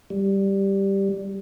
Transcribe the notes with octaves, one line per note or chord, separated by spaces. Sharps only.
G3